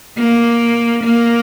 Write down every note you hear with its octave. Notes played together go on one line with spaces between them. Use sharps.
A#3
A#3